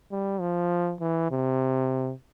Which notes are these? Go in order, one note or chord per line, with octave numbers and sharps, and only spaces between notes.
G3
F3
E3
C3